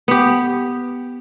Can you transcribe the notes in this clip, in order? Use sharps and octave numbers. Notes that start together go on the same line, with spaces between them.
B3 G4